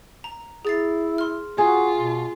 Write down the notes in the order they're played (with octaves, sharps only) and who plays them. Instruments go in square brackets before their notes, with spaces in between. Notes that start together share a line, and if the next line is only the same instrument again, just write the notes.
[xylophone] A#5
[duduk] E4 [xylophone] G#4 A6 C7
[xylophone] C6 F6
[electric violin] F4 [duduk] F#4 [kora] G#4
[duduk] B2